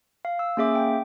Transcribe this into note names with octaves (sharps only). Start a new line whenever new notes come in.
F5
E6
A#3 C#4 G#4 E5 D6
G5